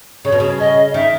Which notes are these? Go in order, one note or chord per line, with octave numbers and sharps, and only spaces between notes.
C#3 C#5
B2
C#3
D#5
D#3 E5